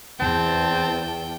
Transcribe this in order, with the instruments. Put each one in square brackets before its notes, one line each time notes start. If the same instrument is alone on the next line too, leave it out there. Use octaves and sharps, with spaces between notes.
[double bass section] E2 [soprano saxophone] C4 [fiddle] G5 [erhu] A5